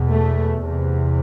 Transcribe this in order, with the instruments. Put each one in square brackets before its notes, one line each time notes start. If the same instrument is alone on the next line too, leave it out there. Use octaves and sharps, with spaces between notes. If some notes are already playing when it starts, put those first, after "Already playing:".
Already playing: [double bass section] E2 B2
A3
E2 C3